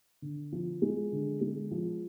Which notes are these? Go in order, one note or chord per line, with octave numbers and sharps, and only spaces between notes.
D3
F3
G#3
D3
G#3
F3